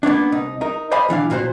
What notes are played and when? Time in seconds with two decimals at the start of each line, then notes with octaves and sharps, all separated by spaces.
0.03 A#3 B3 C#4 D4
0.32 C2 D#4
0.61 D#4 A#4
0.91 C5 D5 D#5 F5 G#5 B5
1.09 B1 E3 D4 F5
1.30 B1 A#2 F#4 G#4 C5